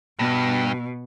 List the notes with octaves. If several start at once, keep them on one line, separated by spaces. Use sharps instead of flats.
G2 B2